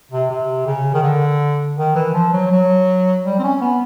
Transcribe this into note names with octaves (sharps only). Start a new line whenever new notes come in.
C3
C3
C#3
D#3
D3
D#3
E3
F3
F#3
F#3
G3
C4
C#4
B3